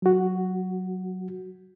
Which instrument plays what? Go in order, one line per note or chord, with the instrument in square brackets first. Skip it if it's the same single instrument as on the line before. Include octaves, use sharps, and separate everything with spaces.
[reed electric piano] F#3 F#4